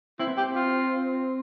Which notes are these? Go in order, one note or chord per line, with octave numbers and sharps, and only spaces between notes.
C4 E4
B3
C4 G4
F4